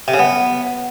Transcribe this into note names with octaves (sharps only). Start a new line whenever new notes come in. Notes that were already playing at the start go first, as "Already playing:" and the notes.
C3
C#3
B3